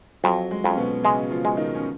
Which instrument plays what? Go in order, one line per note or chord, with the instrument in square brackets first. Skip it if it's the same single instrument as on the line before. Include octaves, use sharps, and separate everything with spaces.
[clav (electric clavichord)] F2 [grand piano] F#3
[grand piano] G#3
[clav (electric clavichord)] F2
[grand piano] C#4
B2 B3
[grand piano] C#3 C#4 [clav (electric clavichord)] G#3
[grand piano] F3 F4
[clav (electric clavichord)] G#3
[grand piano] D#3 D#4
C#4